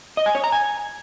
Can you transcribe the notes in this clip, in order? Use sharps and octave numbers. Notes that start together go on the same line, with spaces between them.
D#5
G#5
C#5
A#5
G#5